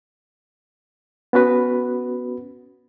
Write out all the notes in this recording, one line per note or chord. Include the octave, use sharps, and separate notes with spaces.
B3 C#4 F#4 B4